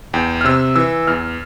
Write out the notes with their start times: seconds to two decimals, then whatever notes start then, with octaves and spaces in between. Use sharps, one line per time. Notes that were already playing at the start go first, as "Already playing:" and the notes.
0.14 E2 G5
0.41 F6
0.45 C3 E6
0.76 E3 E6
1.07 E2 F6